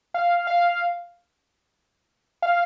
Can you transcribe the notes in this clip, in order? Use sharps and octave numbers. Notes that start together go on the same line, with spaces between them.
F5
F5
F5